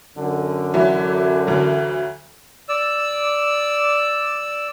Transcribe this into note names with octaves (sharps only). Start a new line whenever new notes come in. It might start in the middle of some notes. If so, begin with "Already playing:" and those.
F#2 D3
E3 F#3 E4
D2 E3 F#3
D5 E6